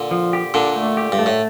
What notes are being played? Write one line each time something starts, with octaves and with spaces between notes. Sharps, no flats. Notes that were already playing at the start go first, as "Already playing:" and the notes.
Already playing: A#2 D3
F3
G4
A#2 D3 D4
A3
G4
G2
A3
A2